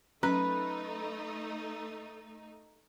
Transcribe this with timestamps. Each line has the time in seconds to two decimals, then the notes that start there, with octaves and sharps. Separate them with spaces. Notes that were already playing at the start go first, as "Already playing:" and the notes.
0.23 F#3 A3 C#4 D#4 B4 A#5